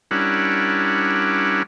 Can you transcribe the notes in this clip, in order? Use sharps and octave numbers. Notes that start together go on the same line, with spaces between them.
G3 C#4 D4 E4 A#4 F#5